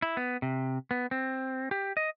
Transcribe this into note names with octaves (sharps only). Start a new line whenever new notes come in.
E4
B3
C3
B3
C4
G4
D#5